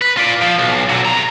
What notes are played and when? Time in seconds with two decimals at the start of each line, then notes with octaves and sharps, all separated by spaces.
0.02 B4
0.17 F4 D5
0.41 F3
0.58 B1
0.89 D3 F#3
1.05 C3 A#5